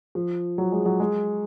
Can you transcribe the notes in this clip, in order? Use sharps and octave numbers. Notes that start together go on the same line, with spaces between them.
F3
F#3
G#3
F#3
G#3